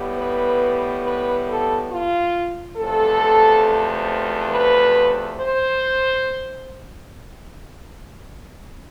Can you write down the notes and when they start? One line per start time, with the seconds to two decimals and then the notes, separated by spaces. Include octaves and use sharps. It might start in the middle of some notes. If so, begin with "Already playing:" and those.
Already playing: A2 G3 B3
0.17 B4
1.04 B4
1.48 A4
1.91 F4
2.77 E2 C3 F3 A3 A4
4.50 B4
5.37 C5